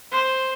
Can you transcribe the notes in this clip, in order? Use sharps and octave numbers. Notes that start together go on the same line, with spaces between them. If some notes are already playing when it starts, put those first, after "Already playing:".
C5